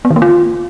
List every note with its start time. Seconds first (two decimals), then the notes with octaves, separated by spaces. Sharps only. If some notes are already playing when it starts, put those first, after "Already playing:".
0.05 B3
0.10 D#3
0.16 A#3
0.22 F4